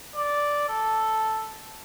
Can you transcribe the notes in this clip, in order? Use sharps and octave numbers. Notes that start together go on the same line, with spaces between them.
D5
A4